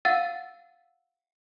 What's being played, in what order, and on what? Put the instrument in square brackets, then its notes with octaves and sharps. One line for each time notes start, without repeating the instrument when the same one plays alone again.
[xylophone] F5 F#5 E6 A6 D#7